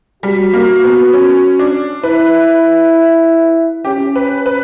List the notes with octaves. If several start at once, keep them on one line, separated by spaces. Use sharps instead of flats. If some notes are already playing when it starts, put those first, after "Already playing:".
G3 F#4
A#3
B3
C#4
D4
E4 B4
C#4 G4
B4
B4